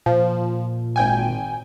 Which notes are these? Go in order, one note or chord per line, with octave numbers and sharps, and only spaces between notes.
A#2 F3
G#1 G5 G#5